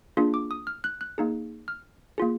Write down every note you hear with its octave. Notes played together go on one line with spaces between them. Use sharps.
A#3 D4 F4 G#4
D6
D#6
F6
F#6
F#6
A#3 D#4 G#4
F6
A#3 F4 G#4